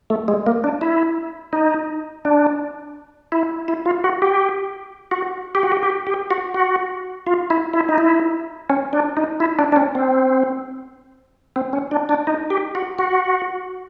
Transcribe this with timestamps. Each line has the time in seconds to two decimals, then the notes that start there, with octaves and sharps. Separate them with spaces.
0.10 A3
0.28 G#3
0.46 A#3
0.64 D4
0.81 E4
1.53 D#4
2.25 D4
3.32 E4
3.68 E4
3.86 F4
4.04 F#4
4.22 G4
5.11 F#4
5.55 G4
5.63 F#4
5.72 G4
5.83 G4
6.07 G4
6.31 F#4
6.54 F#4
7.27 F4
7.50 E4
7.73 E4
7.89 D#4
7.98 E4
8.70 C#4
8.93 D4
9.17 D#4
9.40 E4
9.59 D4
9.72 D4
9.76 C#4
9.95 C4
11.56 C4
11.73 C#4
11.91 D4
12.09 D4
12.27 D#4
12.50 G4
12.75 F#4
12.99 F#4